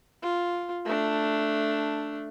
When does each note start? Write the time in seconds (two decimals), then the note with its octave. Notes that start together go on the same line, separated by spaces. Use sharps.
0.23 F4
0.85 A3 D4